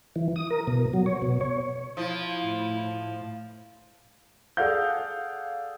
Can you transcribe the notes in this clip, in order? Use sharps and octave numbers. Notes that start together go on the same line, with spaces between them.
E3
D#6
A#4
B2
F#3
C#5
B2
C#5
F3 E4
A2
G#4 A4 D5 F5 F#5 G6